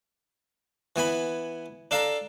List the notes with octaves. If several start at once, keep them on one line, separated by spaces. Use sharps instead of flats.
E3 B3 G#5 B5
D4 A4 F5 A5 A#5